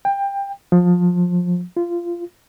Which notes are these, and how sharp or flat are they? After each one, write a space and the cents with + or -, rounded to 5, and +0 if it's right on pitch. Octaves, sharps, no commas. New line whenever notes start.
G5 +20
F3 +25
F4 -20